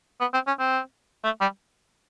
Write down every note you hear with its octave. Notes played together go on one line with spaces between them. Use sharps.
B3
C4
C#4
C4
A3
G3